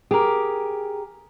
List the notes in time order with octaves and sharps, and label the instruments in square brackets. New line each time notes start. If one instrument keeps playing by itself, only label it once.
[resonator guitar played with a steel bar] G4 A#4 [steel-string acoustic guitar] G#4